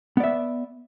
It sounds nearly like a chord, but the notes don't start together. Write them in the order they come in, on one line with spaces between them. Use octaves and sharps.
B3 D5 E5